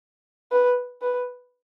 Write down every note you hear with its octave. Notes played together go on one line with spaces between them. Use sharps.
B4
B4